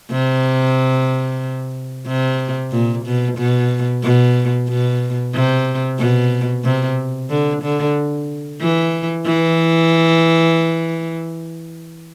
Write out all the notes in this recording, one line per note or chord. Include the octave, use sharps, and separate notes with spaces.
C3
C3
A#2
B2
B2
B2
B2
C3
B2
C3
D3
D3
E3
E3